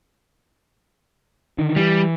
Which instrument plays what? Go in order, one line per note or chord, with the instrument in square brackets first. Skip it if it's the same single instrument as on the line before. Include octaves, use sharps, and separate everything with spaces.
[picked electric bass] D3 D#3
[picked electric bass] E3 [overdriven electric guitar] G3